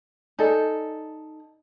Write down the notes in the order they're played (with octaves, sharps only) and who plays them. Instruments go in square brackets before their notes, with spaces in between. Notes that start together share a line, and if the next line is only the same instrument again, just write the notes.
[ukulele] D#4 A4 [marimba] D5 D#5 G#5